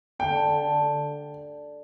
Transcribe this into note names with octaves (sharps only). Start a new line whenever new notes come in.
D3 G5
D3
D3